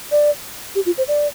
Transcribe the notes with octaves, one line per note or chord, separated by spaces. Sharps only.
D5
G4
F4
C5
D5